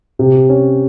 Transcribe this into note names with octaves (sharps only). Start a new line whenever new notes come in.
C3
C#4